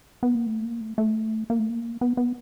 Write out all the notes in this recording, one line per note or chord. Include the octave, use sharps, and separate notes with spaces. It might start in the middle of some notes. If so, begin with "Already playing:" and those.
B3
A#3
A3
A#3
A3
A3
A#3
A3
A#3
B3
B3